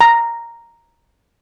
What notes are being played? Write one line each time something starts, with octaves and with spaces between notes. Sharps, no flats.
A#5